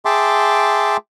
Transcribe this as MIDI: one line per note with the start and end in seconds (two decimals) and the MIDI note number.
0.05 0.97 68
0.05 0.97 76
0.05 0.97 79
0.05 0.97 81
0.05 0.97 84
0.05 0.97 86